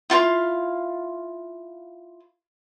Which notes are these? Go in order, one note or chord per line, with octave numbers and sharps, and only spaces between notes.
E4 F4 F5 C6